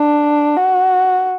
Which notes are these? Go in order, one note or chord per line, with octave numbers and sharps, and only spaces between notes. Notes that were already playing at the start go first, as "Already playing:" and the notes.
Already playing: D4
F#4